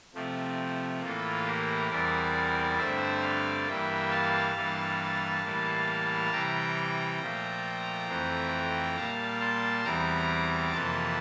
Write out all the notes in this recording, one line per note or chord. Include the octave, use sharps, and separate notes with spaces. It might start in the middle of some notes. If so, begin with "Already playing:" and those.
C3 F3 A3 C4
A2 E3 A#3 F4 A4
G4 A#4
E2 E3 G3 C4 A#4 D5
G2 D3 A3 C4 C5 E5
D5 F5
G2 E3 G3 A#3 E5 G5
F5 A5
G2 E3 G3 A#3
A2 E3 G3 A#3
C3 E3 G3 G5 A#5
A#2 F3 A3
F2 E3 A3 C4
A#2 G3 A#3 F5 A5
A5 C6
E2 E3 G3 C4 A#5 D6
F2 C3 E3 A#3 A5 C6